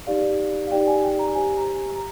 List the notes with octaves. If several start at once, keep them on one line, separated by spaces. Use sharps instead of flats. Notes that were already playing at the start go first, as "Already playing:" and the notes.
D#4 G4 D5 F5
F5
D#4 G4 D5 G5
G#5
G5
A#5
G4 C5 G#5
A#5
A#5